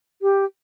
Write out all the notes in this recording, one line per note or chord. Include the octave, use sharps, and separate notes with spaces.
G4